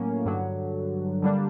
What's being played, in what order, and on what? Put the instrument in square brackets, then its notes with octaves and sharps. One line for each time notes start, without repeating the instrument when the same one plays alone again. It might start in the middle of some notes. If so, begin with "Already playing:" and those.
Already playing: [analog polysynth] A2 F#3 A#3 C#4
G2 D3 F#3
D3 G3 A#3 D4